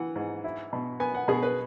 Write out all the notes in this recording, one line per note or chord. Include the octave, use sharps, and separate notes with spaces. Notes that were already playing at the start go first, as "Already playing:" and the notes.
Already playing: E3 F#5
G#2
E4
B2
B3 G#5
F#5
B2 G#4
B4